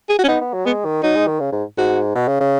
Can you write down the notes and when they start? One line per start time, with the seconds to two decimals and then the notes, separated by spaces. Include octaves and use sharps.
0.09 G#4
0.19 F#4
0.24 C#4
0.28 B3 D#4
0.41 B3
0.54 F#3
0.66 G#3 B3
0.85 D#3
1.03 F#3 D#4
1.16 G#3
1.27 D#3
1.40 C#3
1.52 G#2
1.78 G#2 F#4
2.15 B2
2.28 C#3
2.40 C#3